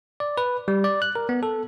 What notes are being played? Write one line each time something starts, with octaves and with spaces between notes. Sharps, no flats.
D5
B4
G3
D5
F#6
A#4
B3
A4